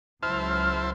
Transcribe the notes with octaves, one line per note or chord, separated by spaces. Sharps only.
C#2 F#3 E4 C5 A5 F6